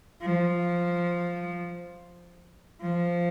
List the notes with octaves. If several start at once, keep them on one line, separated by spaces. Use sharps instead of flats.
F3
F3